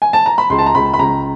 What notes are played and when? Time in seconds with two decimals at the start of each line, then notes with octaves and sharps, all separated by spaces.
0.02 G#5
0.13 A5
0.26 A#5
0.38 B5
0.50 C#2 C6
0.59 A5
0.66 A#5
0.75 C#2 B5
0.94 B5
0.99 C#2 A#5